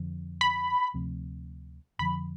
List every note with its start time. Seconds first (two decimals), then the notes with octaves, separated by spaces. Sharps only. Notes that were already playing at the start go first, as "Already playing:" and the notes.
Already playing: F2 D3 F3
0.41 B5
0.94 D2 C3 F3 C4
1.99 F2 D3 F3 B5